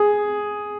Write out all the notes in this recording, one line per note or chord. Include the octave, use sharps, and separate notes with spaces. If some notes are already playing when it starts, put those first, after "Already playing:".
Already playing: G#4